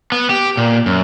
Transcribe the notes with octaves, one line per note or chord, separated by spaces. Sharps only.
B3
G4
A#2
F#2